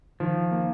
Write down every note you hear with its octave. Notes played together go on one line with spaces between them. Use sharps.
D#3 F3
A#3